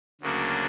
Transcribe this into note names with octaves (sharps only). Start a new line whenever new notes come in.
D2 C#3 F#3 A#3 D4